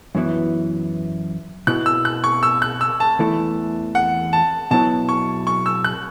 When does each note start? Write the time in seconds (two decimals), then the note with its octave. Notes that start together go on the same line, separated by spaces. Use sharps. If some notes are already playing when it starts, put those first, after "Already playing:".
0.15 F#2 E3 B3 E4
1.67 B2 B3 E4 F#6
1.86 E6
2.05 F#6
2.24 C#6
2.43 E6
2.62 F#6
2.81 E6
3.00 A5
3.19 E2 E3 A3 E4
3.95 F#5
4.33 A5
4.71 B2 F#3 B3 E4 A5
5.09 C#6
5.47 C#6
5.66 E6
5.84 F#6